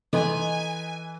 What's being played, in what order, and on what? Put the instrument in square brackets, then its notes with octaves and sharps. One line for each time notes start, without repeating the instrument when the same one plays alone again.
[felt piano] E3 B4 [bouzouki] D#4 [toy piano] A4 D#5 C6 [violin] G#5